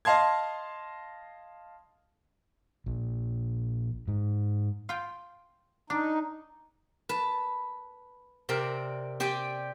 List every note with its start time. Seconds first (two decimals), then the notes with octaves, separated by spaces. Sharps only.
0.05 D#5 F5 A5 C6 G#6
2.86 A#1
4.08 G#2
4.89 F4 G5
5.90 D4 D#4
7.09 B4 A5
8.49 C3 C4 A#4 D5
9.20 C4 G4 D5 G5 G#5